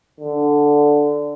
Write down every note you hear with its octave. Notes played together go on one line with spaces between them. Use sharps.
D3